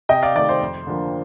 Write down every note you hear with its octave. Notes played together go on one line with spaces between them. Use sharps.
C3 D#5 G5
D5 F5
D#3 A3 D5
C5
F2
D3 F3 A#3